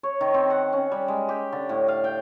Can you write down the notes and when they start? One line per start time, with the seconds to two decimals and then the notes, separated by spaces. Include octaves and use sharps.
0.03 C#5
0.21 D#3
0.34 C4
0.50 F#5
0.73 C#4
0.91 G3
1.08 G#3
1.29 G4
1.53 D3
1.69 A2
1.88 F5
2.04 G5